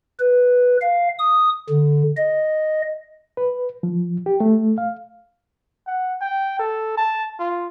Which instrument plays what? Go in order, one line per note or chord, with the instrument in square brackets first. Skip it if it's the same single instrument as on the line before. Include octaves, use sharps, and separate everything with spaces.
[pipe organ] B4
F5
D#6
D3
D#5
[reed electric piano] B4
F3
G4
A3
F5
[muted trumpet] F#5
G5
A4
A5
F4